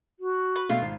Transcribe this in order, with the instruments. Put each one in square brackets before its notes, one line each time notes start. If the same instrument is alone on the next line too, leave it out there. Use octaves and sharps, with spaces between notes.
[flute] F#4
[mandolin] B4
[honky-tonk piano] B2 A3 [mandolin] F4
[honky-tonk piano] G#1